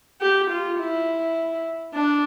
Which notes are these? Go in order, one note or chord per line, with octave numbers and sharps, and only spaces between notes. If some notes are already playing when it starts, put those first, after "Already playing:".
G4
F4
E4
D4